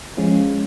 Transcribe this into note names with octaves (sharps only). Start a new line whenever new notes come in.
F3 G#3 C#4 F4